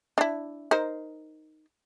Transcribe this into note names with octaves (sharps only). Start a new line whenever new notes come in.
D4 E4
D#4 A#4 C5